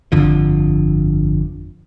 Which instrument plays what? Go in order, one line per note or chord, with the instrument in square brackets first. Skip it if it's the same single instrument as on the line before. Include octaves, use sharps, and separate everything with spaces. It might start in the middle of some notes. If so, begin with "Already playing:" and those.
[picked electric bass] G1 F2 D3 F3